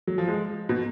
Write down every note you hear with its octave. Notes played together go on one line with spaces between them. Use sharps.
F#3
F3
G#3
B2